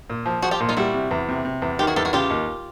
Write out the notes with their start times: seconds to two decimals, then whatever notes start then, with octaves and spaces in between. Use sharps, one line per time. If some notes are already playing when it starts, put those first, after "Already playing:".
0.10 A#2
0.26 F3
0.42 F3 F#4 G#4
0.51 F4 G4
0.60 A#2
0.69 D#4 F4
0.77 G3 E4 F#4
0.94 C3
1.11 E2
1.29 C3
1.45 C3
1.62 E2
1.79 D#3 F4 G4
1.87 F#4 G#4
1.96 E2 G4 A4
2.05 F#4 G#4
2.13 C#3 F4 G4
2.30 D#2